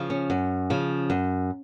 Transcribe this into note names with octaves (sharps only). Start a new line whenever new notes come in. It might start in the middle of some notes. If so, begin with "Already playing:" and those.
Already playing: C#3 F3
C#4
F#2
C#3 F3
F#2